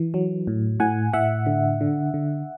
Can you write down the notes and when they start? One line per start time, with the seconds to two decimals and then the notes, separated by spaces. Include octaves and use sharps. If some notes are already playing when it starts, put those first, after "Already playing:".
Already playing: E3
0.14 F#3
0.47 A2
0.80 A2 F#5 G#5
1.13 A2 E5 F#5
1.46 D3
1.81 D3
2.14 D3